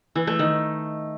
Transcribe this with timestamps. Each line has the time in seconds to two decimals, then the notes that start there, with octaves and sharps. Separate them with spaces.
0.16 E3
0.27 A3
0.39 D#3